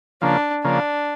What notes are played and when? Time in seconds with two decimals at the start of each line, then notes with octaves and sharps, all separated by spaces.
0.22 C#3 F3 A#3 D4
0.64 C#3 F3 A#3 D4